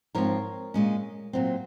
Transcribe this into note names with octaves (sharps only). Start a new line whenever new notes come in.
G#2 F3 C4 A#4 C#5
A#2 G#3 C#4
A#2 F#3 C4